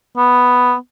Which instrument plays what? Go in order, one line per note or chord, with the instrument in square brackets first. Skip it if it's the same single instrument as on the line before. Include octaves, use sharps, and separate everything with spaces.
[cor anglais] B3